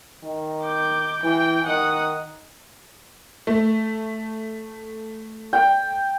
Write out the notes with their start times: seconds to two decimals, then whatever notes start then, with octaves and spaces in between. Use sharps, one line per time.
0.24 D#3
0.63 D6 G6
1.23 E3 G5
1.67 D#3 F#5 D#6
3.47 A3
5.53 G5